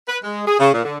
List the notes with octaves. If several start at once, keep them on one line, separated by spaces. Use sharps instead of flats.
B4
G#3
G#4
C#3
A#2
D3